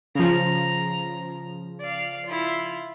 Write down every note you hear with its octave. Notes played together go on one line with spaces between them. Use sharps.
C#3 F3 A#5
D5 F5
E4 F4